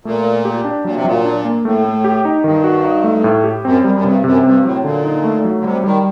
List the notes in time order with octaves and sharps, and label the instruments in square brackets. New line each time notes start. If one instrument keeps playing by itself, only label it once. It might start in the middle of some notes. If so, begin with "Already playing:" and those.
[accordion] A#2 [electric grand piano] A3
[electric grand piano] A#4
G4
D4
[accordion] A#2 [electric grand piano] F#3
[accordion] C3
[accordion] A#2 [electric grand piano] F#3
[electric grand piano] D4
A#3
[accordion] A2 [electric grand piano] A3
[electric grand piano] A3
G4
D#4
[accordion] G2 [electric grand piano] D#3
[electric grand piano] F#4
D#4
A3
A2
G4
[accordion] F#2 [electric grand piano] C4
[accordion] F#2 [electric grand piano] G3
[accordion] F#2
[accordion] G2 [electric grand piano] C3
[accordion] F#2 [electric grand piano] C3
[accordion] G2 [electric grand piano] C4
[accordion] A2 [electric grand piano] F#3
[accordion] A#2 [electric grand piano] D3
[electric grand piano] D#4
A3
F#3
[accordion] D3
[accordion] C3 [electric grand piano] G3
[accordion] D#3 [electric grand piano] G3